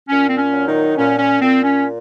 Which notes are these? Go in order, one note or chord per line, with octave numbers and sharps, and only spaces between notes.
A#2 C#4
C4
C#4
F#3
D#3 D#4
A#2 C#4
C#4
A#2 C4
C#4